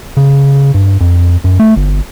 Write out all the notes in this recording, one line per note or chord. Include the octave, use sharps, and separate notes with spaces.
C#3
G2
F2
F#2
A3
G1